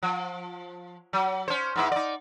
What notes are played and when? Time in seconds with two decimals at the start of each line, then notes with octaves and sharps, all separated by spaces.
0.02 F3
1.13 F#3
1.48 C#4 C5
1.76 G#2 B3 E4
1.92 D#4 D5